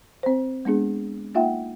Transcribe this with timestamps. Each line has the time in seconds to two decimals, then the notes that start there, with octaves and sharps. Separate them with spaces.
0.23 C4 C5
0.65 G#3 B3 D4 G#4
1.35 A#3 D#4 F4 E5 F#5 G5